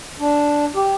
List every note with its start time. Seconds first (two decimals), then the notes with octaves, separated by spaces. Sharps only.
0.20 D4
0.75 G4